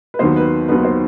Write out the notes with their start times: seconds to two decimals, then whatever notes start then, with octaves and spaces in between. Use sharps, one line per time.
0.14 B4
0.19 D#2 D#3 F#3 B3 C5
0.36 B4
0.68 D#2 D#3 F#3 B3 B4
0.84 C5